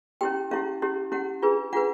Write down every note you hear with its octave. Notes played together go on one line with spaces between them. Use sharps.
C#4 E4 G4 G5
C#4 E4 G4 F5
C#4 E4 G4
C#4 E4 G4 F#5
D4 F4 G#4 B4
D4 F4 G#4 B4 F#5